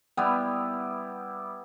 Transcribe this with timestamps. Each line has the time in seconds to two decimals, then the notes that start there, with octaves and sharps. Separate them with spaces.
0.17 G3 B3 E4